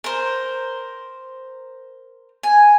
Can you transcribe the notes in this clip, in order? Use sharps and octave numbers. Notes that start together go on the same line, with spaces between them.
A#4 C5
G#5